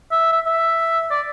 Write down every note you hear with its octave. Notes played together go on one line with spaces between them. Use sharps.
E5
E5
E5
D5